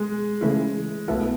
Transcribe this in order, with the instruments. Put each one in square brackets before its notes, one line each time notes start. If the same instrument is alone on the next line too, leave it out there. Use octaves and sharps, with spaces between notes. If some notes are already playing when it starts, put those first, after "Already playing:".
Already playing: [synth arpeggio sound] B2 [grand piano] G#3
[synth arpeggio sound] C#3 E3 A3 E4
[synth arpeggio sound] B1 B2 A3 E4 A4 [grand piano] B3